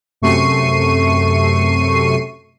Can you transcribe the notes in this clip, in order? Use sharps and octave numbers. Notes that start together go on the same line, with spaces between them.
F#2 C3 A3 C#6 C7 D#7